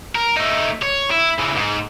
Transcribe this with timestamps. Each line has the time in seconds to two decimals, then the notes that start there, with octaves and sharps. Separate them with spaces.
0.15 A#4
0.37 A3 D#4
0.82 C#5
1.11 E4
1.40 C#3 E3
1.57 G#2